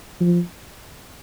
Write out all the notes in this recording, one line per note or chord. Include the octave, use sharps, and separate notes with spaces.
F3